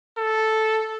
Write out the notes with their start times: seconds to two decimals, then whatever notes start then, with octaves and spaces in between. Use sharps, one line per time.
0.17 A4